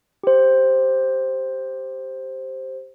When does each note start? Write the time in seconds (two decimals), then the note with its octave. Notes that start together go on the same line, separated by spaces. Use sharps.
0.23 G4 C5